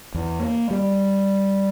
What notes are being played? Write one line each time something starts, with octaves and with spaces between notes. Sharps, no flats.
E2
A#3
G3